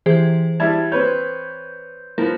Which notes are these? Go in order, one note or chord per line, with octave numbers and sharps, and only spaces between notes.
E3 G4 G#4 C5
G3 E4 A5 G#6
C4 B4 C#5 G6
F3 B3 A#4